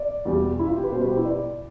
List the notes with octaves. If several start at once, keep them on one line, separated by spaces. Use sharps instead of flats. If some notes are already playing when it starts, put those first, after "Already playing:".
Already playing: D5
E2 B2 G3
E4
F4
G4
B4
B2 G3 B4 C5
G4
E4
D5